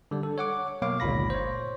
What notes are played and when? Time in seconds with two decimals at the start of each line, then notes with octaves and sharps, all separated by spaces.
0.11 D3 G3
0.23 A4
0.38 C#5 F#5 D6
0.82 B2 F#3 A#3 C#5 F5 D6
1.00 G1 C#2 A#2 B5 A#6
1.30 C5 C#5